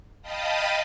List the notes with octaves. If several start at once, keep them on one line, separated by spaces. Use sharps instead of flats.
D#5 F5 G5 A5 B5 D#6